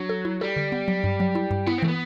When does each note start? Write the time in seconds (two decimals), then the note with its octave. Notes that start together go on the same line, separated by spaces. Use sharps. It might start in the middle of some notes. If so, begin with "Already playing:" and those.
Already playing: F#3 D4
0.09 A4
0.25 E4
0.41 G3 A4
0.56 D3
0.72 B3
0.88 F#3
1.04 G2
1.20 F#3
1.35 E4
1.51 G2
1.66 B3 E4
1.78 C4
1.82 E3 A3
1.88 B3